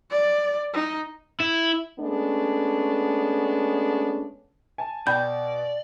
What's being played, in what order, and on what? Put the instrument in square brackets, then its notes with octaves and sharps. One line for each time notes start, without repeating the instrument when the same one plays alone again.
[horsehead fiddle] D5
D#4
[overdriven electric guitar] E4
[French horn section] G#3 A3 B3 C#4 D4
[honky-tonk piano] G#5 A5
[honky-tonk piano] B2 [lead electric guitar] D5 [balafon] G5 B5 [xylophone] G6